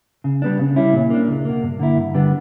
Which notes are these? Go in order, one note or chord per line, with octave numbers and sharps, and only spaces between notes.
C#3
G3 B3 D4
C#3
G3 C#4 E4
A#2
A#3 D4
C#2
B2 A#3
G2
D3 A#3 E4
G2
D3 G3 B3 D4